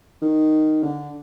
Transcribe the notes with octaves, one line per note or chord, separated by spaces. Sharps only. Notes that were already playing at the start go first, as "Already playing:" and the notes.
D#3
D3